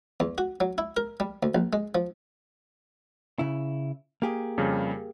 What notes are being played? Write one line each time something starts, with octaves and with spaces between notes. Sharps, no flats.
E2
F#4
F#3
E4
A#4
G3
D2
A#1
G#3
F3
C#3 E4
A#3 G4 G#4
F2 C#3 G3